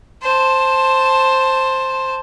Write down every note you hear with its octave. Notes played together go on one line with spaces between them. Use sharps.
C5 A5